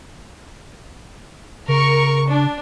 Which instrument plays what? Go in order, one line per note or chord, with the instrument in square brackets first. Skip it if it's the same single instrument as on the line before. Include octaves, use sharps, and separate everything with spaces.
[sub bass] C#3 [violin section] A#4 C#6
[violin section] D4